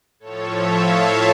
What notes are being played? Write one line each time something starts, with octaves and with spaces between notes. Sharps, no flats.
A2 F3 A4 C#5
C#5 E5
F5 A5